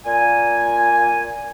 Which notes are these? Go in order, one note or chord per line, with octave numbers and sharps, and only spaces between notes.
A#2 G#5